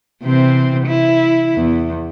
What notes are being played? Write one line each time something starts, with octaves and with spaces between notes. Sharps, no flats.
C3 E3 C4
E4
E2